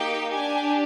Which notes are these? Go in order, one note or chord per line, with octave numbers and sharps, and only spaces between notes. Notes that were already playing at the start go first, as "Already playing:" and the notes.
Already playing: A#3 D#4 G4 G5
D4 G4 G#5